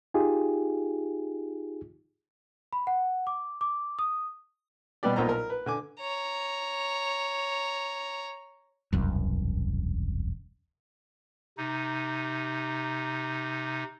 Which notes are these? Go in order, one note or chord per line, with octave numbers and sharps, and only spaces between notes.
D#4 F4 G4 G#4
B5
F#5
D6
D6
D#6
B2 G3 B3 G4 D5
B1 A#2 A#3 F4 C5 A#5
A#4
B4
D3 G#5 D6
C#5 A#5
E1 C2 F#2
C3 D#4